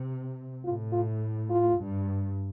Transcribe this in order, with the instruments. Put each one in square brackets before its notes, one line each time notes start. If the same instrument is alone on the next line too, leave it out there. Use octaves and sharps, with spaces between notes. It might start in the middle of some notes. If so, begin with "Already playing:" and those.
Already playing: [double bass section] C3
[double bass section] A2 [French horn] F4
[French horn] F4
F4
[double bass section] G2